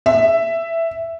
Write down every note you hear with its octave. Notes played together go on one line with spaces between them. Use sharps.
E5